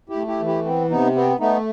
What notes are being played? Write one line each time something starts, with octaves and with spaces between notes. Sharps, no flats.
E4 G4
A3
E4 G4
E3
E4 G4
B3 C4
C3 B3 D#4
B3 C4
A3 B3 D#4